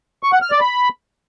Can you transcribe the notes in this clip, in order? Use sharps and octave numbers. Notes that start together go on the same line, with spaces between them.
C#6
F#5
F6
D5
B5